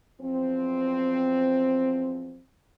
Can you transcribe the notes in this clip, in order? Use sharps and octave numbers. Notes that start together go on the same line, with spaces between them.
E2 F3 C4